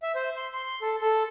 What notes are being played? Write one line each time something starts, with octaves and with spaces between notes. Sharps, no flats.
E5
C5
C6
C6
A4
A4